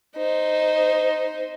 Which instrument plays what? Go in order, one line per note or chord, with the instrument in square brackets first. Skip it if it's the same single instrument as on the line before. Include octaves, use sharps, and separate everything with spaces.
[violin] D#4 C5